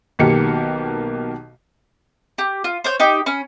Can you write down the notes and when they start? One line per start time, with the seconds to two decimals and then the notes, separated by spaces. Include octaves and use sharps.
0.19 B1 B2 D#3 A#3 G4 C#7
2.38 G4
2.64 F4
2.84 C5 C#5 G6
3.00 D#4 G4 G5
3.26 C#4 B5